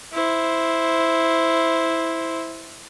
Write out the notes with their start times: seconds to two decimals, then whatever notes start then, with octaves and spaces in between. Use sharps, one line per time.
0.13 E4 C5